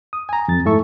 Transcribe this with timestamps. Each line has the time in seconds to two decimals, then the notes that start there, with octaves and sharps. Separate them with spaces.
0.13 D#6
0.29 G#5 A#5
0.48 F2 A6
0.65 G#2 A3 E4 A4 E5 C#6